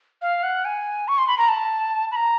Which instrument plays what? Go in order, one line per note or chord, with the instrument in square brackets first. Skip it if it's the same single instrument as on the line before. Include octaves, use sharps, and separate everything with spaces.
[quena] F5
F#5
G#5
C#6
C6
B5
A#5
A5
B5
A#5